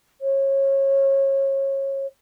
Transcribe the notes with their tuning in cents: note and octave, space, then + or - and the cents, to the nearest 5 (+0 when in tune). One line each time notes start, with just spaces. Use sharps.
C#5 -25